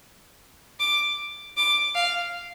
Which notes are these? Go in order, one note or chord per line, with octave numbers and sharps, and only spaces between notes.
D6
D6
F5